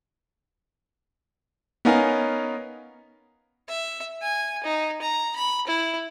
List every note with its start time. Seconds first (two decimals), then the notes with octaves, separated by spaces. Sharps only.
1.85 B3 C#4 D#4 A#4 F5 G#5
3.68 E5
4.22 G#5
4.63 D#4
5.02 A#5
5.36 B5
5.67 E4